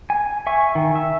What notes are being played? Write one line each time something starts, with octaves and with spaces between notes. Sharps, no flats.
G#5
E5 G#5 C#6
D#3
E5